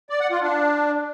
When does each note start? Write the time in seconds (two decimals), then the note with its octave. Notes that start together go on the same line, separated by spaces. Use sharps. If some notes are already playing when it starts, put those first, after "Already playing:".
0.10 D5
0.20 F#5
0.31 F4
0.41 D4